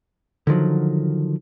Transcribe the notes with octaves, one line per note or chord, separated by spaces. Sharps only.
D3 D#3 F3 F#3